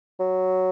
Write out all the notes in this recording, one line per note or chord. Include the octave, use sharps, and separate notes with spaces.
F#3